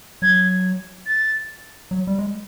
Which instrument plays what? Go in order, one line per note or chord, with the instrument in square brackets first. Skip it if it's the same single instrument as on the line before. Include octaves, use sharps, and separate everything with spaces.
[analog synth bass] F#3 [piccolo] G#6
[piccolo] A6
[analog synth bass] F#3
G3
G#3